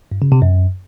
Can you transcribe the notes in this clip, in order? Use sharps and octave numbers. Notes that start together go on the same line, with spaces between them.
G2
C#3
C3
F#2